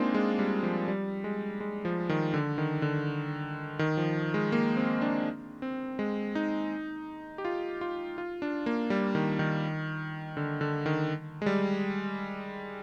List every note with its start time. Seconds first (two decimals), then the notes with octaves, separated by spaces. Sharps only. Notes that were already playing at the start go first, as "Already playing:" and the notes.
Already playing: G#3 A#3 C4 D4 D#4 F4
0.14 G#3
0.39 G3
0.63 F3
0.88 G3
1.24 G#3
1.60 G#3
1.85 F3
2.09 D#3
2.34 D3
2.58 D#3
2.82 D3
3.79 D#3
3.97 F3
4.34 G#3
4.52 A#3
4.77 C4
5.01 D4
5.62 C4
5.99 G#3
6.35 D#4
7.38 G4
7.45 F4
7.81 F4
8.18 F4
8.42 D4
8.66 A#3
8.90 G3
9.15 D#3
9.39 D#3
10.37 D3
10.61 D3
10.86 D#3
11.42 G#3
11.46 G3